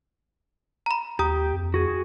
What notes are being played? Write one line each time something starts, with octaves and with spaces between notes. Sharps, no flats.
A#5 B5
D#2 G4 A#5 D#6
F2
F#4 G#4